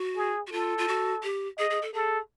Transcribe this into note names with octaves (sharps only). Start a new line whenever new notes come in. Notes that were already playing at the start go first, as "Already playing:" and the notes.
Already playing: F#4
G#4
F#4
F4 A4
F4
F#4
G4
G#4 D#5
G#4
A4
G#4 A4